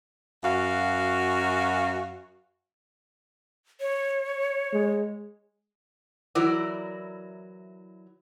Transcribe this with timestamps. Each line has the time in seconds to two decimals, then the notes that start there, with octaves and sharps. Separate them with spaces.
0.44 F#2 F#4 F5
3.81 C#5
4.73 G#3
6.35 E3 F#3 E4 A#4 D5